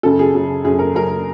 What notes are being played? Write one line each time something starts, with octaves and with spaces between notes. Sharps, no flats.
F#2 C#3 F#3 A4
G#4
F#2 C#3 F#3
F#2 C#3 F#3 G#4
A#4
F#2 C#3 F#3 A#4